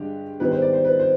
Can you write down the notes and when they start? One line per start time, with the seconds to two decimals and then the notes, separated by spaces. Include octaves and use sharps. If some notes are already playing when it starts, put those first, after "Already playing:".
Already playing: G2 D3 G#3 G4
0.40 G#2 D#3 G3 B3 B4
0.51 C5
0.62 D5
0.73 C5
0.85 B4
1.00 C5